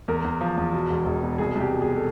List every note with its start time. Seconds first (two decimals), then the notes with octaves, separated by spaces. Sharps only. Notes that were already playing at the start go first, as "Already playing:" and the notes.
0.08 E2 A#4
0.24 E2
0.41 F3
0.57 E2
0.73 B2
0.90 E1
1.06 E1
1.23 B2
1.38 C2 G#4
1.55 C2
1.60 G4
1.72 B2
1.82 G#4
1.87 B2
1.96 A4